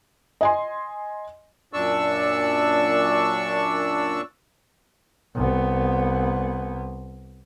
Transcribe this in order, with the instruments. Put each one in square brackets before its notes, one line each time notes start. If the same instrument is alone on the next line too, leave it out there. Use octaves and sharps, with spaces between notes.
[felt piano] D#5 G#5 C6
[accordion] F#2 A#2 D4 D5 C#6 E6
[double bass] C2 B3